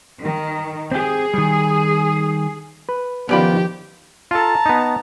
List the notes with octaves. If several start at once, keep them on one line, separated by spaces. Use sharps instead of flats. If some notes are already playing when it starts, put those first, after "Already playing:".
D#3
C4 G4 G#4
D#3 G3
B4
D#3 F3 B3 C#4 F4 G4 D5 B5
F4 A4 A5 A#5
B3 D#4